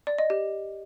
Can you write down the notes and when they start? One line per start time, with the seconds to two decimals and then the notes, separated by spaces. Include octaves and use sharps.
0.07 D5
0.18 D#5
0.30 G4